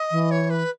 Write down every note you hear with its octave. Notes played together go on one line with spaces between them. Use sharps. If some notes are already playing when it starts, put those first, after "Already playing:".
Already playing: D#5
E3
C#5
B4